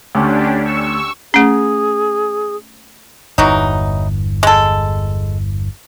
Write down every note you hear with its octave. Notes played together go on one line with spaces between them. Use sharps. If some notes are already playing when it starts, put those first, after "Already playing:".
D2 C#4 D4 G4
C#6 E6
A3 C#4 G#4
G1 E2 E3 F#3 D#4
G#3 A4